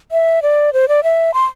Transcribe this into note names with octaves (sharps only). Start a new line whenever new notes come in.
E5
D5
C5
D5
E5
C6